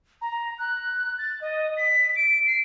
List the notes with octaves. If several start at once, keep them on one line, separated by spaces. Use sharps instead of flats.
A#5
F#6
A6
D#5
B6
D7
C7